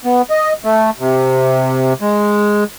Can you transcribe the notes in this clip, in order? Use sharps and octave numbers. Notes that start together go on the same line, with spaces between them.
B3
D#5
A3
C3
G#3